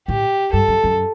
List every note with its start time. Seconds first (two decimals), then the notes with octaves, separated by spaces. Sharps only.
0.08 A2 G4
0.53 G2 A4
0.68 F#2
0.84 F#2